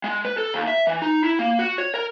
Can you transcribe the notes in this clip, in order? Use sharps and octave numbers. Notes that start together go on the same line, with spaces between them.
G#3
B4
A4
D#2
E5
E3
D#4
E4
A#3
F#4
C#5
A#4